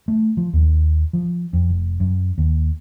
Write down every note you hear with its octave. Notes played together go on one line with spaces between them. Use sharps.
A3
F3
D#2
F3
F2
F1
F#2
D#2